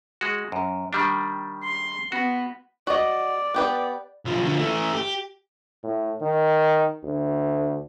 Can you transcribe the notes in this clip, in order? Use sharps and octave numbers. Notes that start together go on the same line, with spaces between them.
G#3 F#4
F#2
D#3 G3 D4
C6
B3 F#4
F#4 D5 D#5
B3 G4 B4
B1 F3
D3 F3
E3 A3
G4
A2
D#3
D2